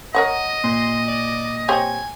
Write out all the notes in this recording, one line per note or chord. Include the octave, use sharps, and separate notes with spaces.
A#4 C#5 D#5 F#5
A#2 C6
D5
C4 G4 C#5 G#5